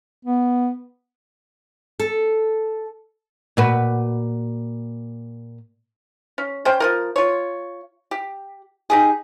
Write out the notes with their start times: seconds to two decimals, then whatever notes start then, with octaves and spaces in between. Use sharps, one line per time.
0.25 B3
2.00 A4
3.57 A#2 F#4 B4
6.38 C#4
6.65 C#4 C5 G5
6.80 F3 D#4 A#4
7.16 F4 C#5
8.11 G4
8.90 D#4 G4 G#4